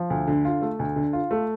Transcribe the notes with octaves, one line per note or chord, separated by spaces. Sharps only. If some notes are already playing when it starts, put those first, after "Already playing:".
Already playing: F3
D2
D3
F4
A3
D2
D3
F4
A3